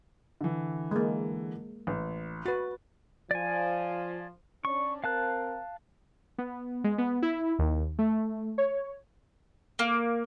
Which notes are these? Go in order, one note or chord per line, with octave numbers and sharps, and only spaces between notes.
D3 E3
G#3 A#3
A1
F#4 B4 A6
F3 D5 G#5
C#4 D4 C#6
C4 A#4 F5 A5 F#6
B3
G#3
B3
E4
D#2
A3
C#5
A#3